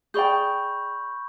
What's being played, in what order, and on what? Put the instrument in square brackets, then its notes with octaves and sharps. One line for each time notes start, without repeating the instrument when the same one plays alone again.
[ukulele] G#4 D5 G5 [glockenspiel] B5 C#6 G6